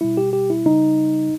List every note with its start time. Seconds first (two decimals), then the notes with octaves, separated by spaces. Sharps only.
0.01 B2 G3 E4
0.17 G4
0.33 G4
0.50 E4
0.66 C#3 G3 D#4